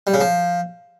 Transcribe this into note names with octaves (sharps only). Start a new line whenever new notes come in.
G3
C#3
F3